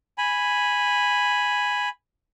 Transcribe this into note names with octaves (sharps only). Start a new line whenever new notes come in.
G#5 B5